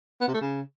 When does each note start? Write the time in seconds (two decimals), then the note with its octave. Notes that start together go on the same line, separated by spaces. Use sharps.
0.21 B3
0.28 C3
0.34 A3
0.41 C#3